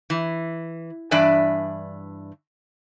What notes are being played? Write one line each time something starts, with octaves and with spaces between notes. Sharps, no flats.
E3
G2 E3 D4 D5 E5 G#5